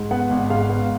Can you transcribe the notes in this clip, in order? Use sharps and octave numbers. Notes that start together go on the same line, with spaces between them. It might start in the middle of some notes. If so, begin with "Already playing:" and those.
Already playing: G#2
B3 F#5
G#1
G#2 F5
B3